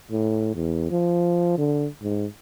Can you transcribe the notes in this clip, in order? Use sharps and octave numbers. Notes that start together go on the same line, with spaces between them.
A2
E2
F3
D3
G#2